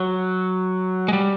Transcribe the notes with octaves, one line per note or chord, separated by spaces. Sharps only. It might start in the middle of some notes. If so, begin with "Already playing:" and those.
Already playing: F#3
G#3
G3